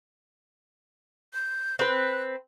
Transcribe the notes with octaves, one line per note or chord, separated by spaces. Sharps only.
G6
C4 B4 F#6